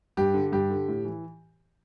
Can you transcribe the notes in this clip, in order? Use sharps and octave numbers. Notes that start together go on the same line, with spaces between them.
G2 G4
D3
G2 G4
D3
A2
E3